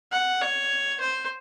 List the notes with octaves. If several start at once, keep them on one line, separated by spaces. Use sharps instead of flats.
F#5
C#5
C5